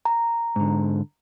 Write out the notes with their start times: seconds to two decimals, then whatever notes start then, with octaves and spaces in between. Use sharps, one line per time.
0.05 A#5
0.56 G#2 D3